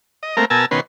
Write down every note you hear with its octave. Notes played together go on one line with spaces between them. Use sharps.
D#5
A3 A#3 C4 A#4
B2 A#4 G#5 A5 E6
B2 D#3 C#4 B4 C6